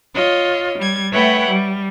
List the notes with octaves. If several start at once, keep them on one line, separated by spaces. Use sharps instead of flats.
F4 C#5 D#5
G3 G#6
A3 E4 B4 C#5 F#5 G5
G3